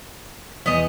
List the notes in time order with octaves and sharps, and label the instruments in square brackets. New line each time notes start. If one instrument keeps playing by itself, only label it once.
[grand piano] E2 [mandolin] B3 D#5